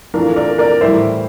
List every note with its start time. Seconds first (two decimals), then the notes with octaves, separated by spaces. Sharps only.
0.14 E3 A3 D4 F4 A#4
0.36 A#4 D5
0.58 A#4 D5
0.81 A2 E3 G3 C5 E5